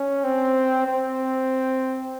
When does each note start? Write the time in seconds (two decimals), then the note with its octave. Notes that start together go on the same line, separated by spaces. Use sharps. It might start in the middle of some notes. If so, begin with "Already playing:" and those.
Already playing: C#4
0.24 C4
0.87 C4